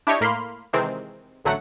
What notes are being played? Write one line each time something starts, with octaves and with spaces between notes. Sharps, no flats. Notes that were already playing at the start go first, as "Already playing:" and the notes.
D4 E4 G4 C#5 D#5
A2 A#3 B5 C6 F6
C3 D#3 E3 G#3 C4
A1 D3 F#3 A3 F#5